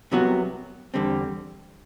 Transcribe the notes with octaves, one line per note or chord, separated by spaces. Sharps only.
C2 C3 F#3 B3 F#4
E2 D3 G3 C4